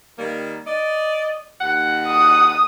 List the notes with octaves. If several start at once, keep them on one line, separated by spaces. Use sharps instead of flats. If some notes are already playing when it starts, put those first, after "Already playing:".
D#3 G3 A#3
D5 D#5
D#2 F#5
D#6